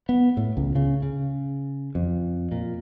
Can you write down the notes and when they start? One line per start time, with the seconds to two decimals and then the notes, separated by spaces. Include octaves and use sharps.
0.09 B3
0.37 A2
0.57 C#2
0.75 C#3
1.03 C#3
1.95 F2
2.52 A#2